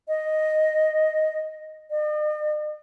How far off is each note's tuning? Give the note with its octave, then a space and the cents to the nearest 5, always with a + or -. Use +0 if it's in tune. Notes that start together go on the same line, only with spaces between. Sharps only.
D#5 +0
D#5 -45